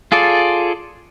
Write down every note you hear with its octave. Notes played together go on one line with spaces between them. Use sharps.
F4 G#4 A4 D5